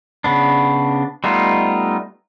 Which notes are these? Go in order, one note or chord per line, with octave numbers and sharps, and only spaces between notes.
C#3 B3 D4
G3 A3 B3 D#4 F4